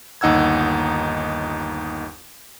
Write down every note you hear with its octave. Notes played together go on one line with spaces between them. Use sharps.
G1 D#2 D#4 F#5 E6 G#6